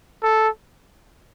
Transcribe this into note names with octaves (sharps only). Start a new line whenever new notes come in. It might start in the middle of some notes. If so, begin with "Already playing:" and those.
A4